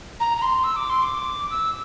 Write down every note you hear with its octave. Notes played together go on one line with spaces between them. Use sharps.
A#5
A#5
C6
E6
D6
C6
D6
E6